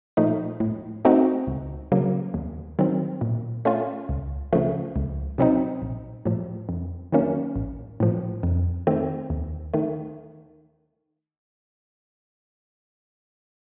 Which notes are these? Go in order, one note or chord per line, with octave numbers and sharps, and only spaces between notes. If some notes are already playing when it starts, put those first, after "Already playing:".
A#2 F3 A3 D#4
A2
A3 C4 D#4 F#4
C#2
C#3 F#3 A#3
D#2
D#3 F#3 C4
A#2
A3 C#4 F4
C#2
C#3 F3 A3
C#2
C3 F#3 C4 D#4
A#1
A2 F3
F2
D#3 F#3 A#3 C#4
A1
A2 F3
F2
D#3 A3 C4
D#2
D#3 A3